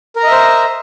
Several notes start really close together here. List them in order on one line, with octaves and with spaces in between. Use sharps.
A#4 A#5 D#5 E5 C5